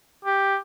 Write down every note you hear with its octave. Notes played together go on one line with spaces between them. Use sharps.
G4